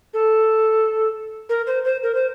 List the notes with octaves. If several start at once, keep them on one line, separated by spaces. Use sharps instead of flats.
A4
A#4
C5
C5
A#4
C5